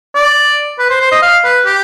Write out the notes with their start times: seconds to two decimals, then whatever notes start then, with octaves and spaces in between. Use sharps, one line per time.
0.15 D5
0.79 B4
0.90 C5
1.01 C5
1.11 D#5
1.22 F5
1.45 B4
1.66 G4